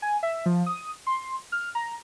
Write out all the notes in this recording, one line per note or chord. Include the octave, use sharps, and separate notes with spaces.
G#5
E5
F3
D#6
C6
F6
A#5